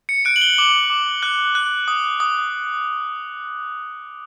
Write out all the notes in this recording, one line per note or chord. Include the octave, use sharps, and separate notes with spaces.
C#7
F#6 D7
F#7
G7
D6 F#7
D6
F#6
F#6
D#6
D#6